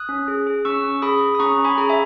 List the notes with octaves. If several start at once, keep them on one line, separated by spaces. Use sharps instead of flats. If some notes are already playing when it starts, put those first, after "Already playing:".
Already playing: D#6 F#6
C#4
G#4
G#4
C#4 C#6 E6
C#4
G#4 B5 D#6
G#4
D#6
C#4 A#5 C#6
C#4
G#5 B5
G#4 A#5
E5 G#5